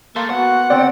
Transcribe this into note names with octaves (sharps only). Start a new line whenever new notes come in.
A#3 A4 E5 C6
B3 F#4 F#5
D3 C4 C#4 D5 G5